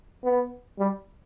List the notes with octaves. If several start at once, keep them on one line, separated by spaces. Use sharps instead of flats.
B3
G3